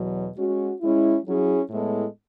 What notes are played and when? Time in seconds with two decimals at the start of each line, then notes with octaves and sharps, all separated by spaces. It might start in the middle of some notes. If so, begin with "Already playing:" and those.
Already playing: E2 B2 F#3
0.37 G#3 C#4 F#4
0.81 G#3 C#4 E4
1.25 F#3 C#4 E4 G#4
1.70 A2 G#3 B3 E4 A4